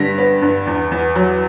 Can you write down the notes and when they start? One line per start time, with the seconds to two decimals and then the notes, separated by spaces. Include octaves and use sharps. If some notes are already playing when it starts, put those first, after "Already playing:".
Already playing: G2 D3 G3 A#6 B6
0.18 B3
0.42 G2
0.67 E2
0.91 E2
1.15 F#3